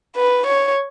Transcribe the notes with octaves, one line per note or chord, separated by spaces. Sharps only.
B4
C#5